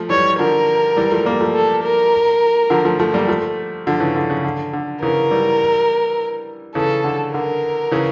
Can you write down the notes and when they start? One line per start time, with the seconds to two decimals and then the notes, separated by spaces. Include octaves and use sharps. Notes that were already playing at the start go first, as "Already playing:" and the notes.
Already playing: F3 A3
0.09 E3 G3 C#5
0.39 D3 F3 A#4
0.97 E3 G3
1.12 F3 A3
1.25 G3 A#3
1.40 F3 A3
1.55 A4
1.83 A#4
2.70 D3 F3
2.85 F3 A3
2.99 F3 A3
3.14 G3 A#3
3.28 F3 A3
3.87 D3 F3
4.00 C#3 E3
4.16 D3
4.30 C#3
4.44 D3
4.73 D3
5.01 C#3 E3 A#4
5.31 E3 G3
6.75 C#3 E3 A4
7.04 D3
7.33 D3 A#4
7.92 C#3 E3